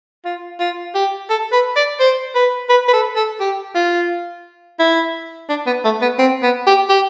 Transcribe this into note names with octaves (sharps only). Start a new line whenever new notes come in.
F4
F4
G4
A4
B4
D5
C5
B4
B4
B4
A4
A4
G4
F4
E4
D4
B3
A3
B3
C4
B3
G4
G4